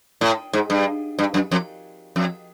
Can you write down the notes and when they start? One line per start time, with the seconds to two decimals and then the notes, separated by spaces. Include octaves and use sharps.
0.21 A2
0.53 G#2
0.70 G2
1.19 G2
1.34 F#2
1.51 F2
2.16 F2